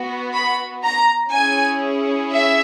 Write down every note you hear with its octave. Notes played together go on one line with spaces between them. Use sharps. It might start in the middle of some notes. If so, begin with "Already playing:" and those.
Already playing: B3 F#4
B5
A#5
C#4 E4 G#4 G#5
E5